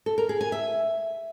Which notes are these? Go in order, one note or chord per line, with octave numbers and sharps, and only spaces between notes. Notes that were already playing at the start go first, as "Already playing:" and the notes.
A4
A#4
G#4
G#5
E5